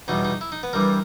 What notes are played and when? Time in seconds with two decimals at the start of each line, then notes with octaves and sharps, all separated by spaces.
0.08 E2 B2 G3 D#4
0.25 D#4
0.41 E4
0.52 D#4
0.63 B3
0.73 G2 E3 G3 A#4